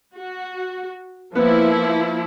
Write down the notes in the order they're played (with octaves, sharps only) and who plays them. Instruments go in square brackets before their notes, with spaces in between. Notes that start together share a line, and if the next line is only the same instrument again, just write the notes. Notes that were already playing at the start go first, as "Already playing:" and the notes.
[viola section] F#4
[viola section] F3 A#3 E4 [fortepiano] B3